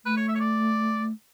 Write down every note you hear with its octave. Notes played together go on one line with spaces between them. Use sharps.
A3 B4
C#5
E5
C#5
D5